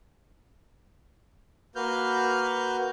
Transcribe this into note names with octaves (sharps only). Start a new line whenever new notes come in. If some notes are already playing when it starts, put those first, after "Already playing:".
A#3 F#4 B4 F6 G6